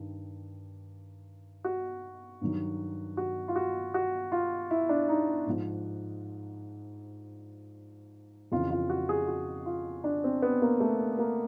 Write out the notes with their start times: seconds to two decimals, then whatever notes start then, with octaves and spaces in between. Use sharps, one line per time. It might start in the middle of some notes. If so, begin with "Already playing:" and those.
Already playing: G2 D#3
1.64 F#4
2.41 G2 D#3 F#3
3.17 F#4
3.48 F4
3.56 F#4
3.94 F#4
4.32 F4
4.71 E4
4.89 D4
5.09 D#4
5.46 G#2 F3
8.52 F2 C#3 E3 F4
8.70 F4
8.90 F#4
9.09 G#4
9.28 F#4
9.66 F4
10.04 D4
10.24 C4
10.42 B3
10.62 A#3
10.80 A3
11.19 A#3